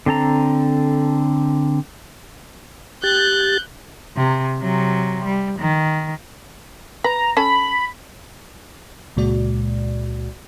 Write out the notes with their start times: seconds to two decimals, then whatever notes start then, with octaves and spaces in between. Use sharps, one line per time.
0.06 D3 C4 A4 A#5
3.03 G4 F#6 G6 A6
4.17 C3
4.60 C3 F#3
5.25 G3
5.59 D#3
7.04 B4 A#5
7.37 C#4 A4 A5 B5
9.17 C#2 A#2 G#3 F#4 D5